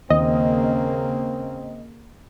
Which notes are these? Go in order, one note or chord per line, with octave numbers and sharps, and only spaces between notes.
D#2 C#3 A#3 C4 D#5